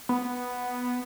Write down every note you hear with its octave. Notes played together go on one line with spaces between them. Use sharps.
B3